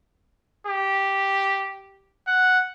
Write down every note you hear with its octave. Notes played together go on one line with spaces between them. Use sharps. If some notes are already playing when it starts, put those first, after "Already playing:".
G4
F#5